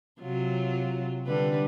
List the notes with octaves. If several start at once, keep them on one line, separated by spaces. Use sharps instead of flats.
C3 F#3 F4
D3 G3 B4